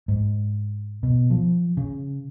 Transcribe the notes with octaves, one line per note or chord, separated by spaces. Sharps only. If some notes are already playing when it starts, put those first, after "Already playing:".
G#2
B2
F3
C#3